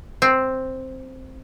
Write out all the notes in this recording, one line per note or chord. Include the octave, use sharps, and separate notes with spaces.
C4